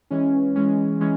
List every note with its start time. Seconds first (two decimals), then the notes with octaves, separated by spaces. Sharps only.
0.11 E3 G#3 C#4
0.56 E3 G#3 C#4
1.00 E3 G#3 C#4